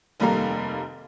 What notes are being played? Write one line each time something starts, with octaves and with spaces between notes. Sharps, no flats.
F1 D#2 G3 A#3 A4 A#5